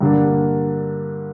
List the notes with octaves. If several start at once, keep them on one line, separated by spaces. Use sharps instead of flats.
G2 D3 A#3 D4